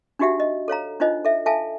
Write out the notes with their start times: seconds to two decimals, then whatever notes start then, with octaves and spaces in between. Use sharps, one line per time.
0.19 D4 D#4 F#4 G4 E5 F#5
0.40 D#5
0.68 A4 C#5 F5 A#5
1.00 D4 D#4 F4 C5 D#5
1.25 A4 E5
1.46 A4 E5 F5 G#5 A5